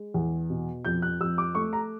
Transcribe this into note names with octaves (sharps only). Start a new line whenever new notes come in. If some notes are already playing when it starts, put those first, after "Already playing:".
Already playing: G#3
E2
B2
F2 G6
F#6
F2 E6
D6
A3 C#6
A#5